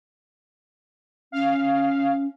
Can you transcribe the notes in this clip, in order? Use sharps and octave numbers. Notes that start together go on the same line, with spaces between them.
C#4 F5